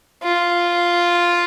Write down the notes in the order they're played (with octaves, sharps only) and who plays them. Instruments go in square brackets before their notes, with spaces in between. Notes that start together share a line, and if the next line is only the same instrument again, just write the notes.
[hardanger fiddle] F4